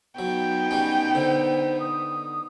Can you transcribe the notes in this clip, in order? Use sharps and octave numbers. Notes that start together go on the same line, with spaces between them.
F#3 B3 D#4 G5
G3 C#4
D3 C5
D#6